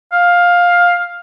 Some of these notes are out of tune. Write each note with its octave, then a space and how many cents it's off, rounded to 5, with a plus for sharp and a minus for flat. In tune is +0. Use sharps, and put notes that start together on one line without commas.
F5 +10